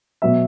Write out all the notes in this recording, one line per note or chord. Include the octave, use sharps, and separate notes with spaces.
B2 F#3 B3 E5